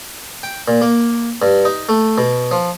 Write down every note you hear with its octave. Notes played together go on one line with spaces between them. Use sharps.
G5
A#2
A#3
G2
D#4
A3
B2
F3